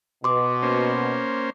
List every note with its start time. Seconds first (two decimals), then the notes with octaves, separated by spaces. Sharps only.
0.24 B2 C6 D6
0.63 A#3 C#4 C5